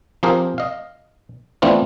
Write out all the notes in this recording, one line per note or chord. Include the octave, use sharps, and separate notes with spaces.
F3 C4 G4 G#4 A#4
D#5 F5
E3 A3 B3 C4 D4 F4